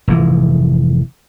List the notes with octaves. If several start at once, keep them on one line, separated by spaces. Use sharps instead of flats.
F1 G#2 E3